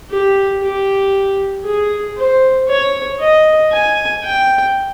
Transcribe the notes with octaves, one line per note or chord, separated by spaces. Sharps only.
G4
G4
G#4
C5
C#5
D#5
G#5
G5